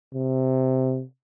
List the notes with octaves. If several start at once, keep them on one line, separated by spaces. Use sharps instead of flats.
C3